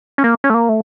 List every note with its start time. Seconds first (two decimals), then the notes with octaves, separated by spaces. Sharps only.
0.18 C#4
0.24 A#3
0.44 C#4
0.50 A3
0.54 A#3
0.69 A3